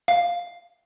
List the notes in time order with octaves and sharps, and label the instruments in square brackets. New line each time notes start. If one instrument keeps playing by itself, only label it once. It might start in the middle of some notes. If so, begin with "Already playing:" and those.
[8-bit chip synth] F5